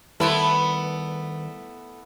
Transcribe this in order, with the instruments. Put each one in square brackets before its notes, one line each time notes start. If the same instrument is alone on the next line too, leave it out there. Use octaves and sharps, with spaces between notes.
[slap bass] D#3 G3 [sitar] A3 B3 E4 [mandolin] G#4 B5 C6